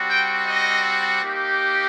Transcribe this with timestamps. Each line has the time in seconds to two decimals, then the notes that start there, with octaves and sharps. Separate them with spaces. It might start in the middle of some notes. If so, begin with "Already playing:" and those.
Already playing: G3 C4 F#4
0.09 G5
0.46 D#5
1.22 A#3 D#4 G4